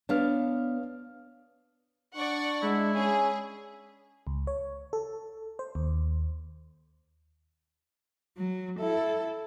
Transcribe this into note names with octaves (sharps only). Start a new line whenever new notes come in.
B3 D4 C#5 F5 F6
D4 D5 F#5 C#6
G#3 E4
C#4 G#4
C#2
C#5
A4
C5
D#2
F#3
E4 A4